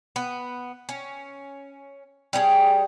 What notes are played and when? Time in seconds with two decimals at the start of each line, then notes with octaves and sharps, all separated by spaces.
0.16 B3
0.89 C#4
2.33 G3 C#4 D#4 G#4